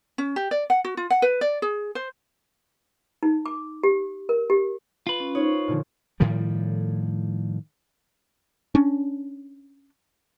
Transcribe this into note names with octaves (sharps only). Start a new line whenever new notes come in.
C#4
G4
D5
F#5
F#4
F4
F#5
B4
D5
G#4
C5
D#4
D6
G4
A#4
G4
F4 B4
C#4
D#4 C5 C#5
A#2 D3 F3
A2 D#3 F3 G3
C#4 D4